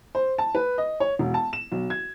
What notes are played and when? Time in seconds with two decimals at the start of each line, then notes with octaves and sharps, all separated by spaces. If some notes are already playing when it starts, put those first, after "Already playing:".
0.15 C5
0.38 A5
0.55 B4
0.78 D#5
1.00 C#5
1.19 E1
1.34 A5
1.53 E7
1.72 B1
1.90 G#6